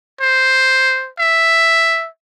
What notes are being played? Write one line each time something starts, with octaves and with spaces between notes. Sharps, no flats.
C5
E5